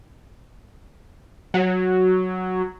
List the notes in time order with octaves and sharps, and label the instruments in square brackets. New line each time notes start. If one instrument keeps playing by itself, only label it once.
[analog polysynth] F#3